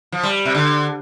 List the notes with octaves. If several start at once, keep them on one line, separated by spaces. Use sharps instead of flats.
F3
G3
C3
D3